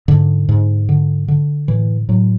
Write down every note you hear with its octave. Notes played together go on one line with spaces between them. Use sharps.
G#2 D3
G#2
D3
D3
A2 E3
A2 F#3